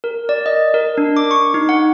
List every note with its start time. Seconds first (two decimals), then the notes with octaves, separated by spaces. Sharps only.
0.04 A#4
0.29 D5
0.46 D#5
0.74 A#4
0.98 D4
1.17 D6
1.31 C#6
1.54 D#4
1.69 F#5